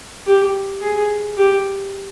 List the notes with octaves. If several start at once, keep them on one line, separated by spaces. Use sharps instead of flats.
G4
G#4
G4